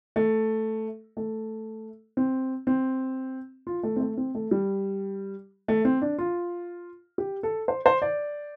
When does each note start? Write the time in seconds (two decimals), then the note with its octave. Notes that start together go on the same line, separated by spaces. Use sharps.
0.16 A3
1.17 A3
2.17 C4
2.67 C4
3.67 F4
3.83 A3
3.96 C4
4.00 A3
4.17 C4
4.35 A3
4.51 G3
5.68 A3
5.85 C4
6.02 D4
6.18 F4
7.18 G4
7.43 A4
7.68 C5
7.86 C5
8.02 D5